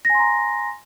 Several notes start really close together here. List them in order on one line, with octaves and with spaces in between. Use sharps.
A#6 G#5 C6 A#5